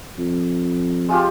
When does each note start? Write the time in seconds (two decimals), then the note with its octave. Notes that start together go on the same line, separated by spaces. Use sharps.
0.18 F2
1.09 G#3 F4 G4